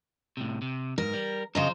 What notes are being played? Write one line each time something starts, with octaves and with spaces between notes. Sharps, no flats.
A2 C3
C3
G#2 A#4
G3
C#3 F3 C5 D#5 A#5